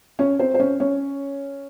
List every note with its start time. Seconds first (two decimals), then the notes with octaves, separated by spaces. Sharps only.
0.19 C#4 C#5
0.39 C4 C5
0.54 C5
0.59 C#4 C#5
0.80 C#4 C#5